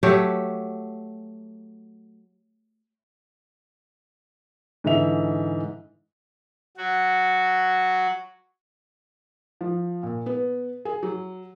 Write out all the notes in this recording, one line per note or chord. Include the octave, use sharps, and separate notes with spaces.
F#3 A3 G4
G#2 D3 E3 E5 F7
F#3 F#4
F3
A#2
B3
G#4
F#3